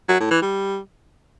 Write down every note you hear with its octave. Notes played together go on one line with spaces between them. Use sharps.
F#3
A2
E3
G3